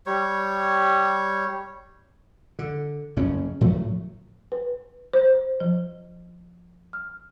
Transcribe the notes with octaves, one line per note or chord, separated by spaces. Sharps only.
G3 C#5
D3
F#1 F2 C#3 C#4
A2 F3 F#3 A3
B4
C5
F3
F6